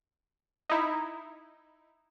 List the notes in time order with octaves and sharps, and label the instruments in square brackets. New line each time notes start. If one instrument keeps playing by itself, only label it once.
[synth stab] D#4 E4